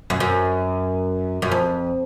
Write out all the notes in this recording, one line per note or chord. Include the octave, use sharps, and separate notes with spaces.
F#2
F#2
F#2
F2